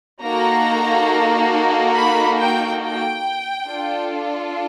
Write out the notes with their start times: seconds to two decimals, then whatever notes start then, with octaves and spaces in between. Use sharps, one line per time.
0.22 A#3 D#4 F#4 A4 A#5
1.95 B5
2.38 G5
2.82 G5
3.68 D4 F4 A4